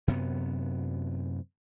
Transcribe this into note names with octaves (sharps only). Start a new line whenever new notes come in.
F#2 C3 B3